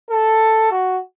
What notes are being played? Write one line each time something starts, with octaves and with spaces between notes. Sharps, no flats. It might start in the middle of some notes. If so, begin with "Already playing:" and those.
A4
F#4